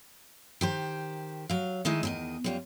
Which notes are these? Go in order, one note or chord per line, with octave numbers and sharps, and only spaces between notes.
D#3 G4 C5
F#3 F5
D#3 G#3 D#4 E4 D#5
E2 D#3 D#5
F#2 G3 F4